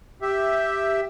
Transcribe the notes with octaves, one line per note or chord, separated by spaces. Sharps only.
G4 E5